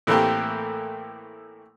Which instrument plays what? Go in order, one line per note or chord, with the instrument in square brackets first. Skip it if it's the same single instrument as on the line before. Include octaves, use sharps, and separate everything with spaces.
[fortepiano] A2 E3 A3 A#3 C4 G4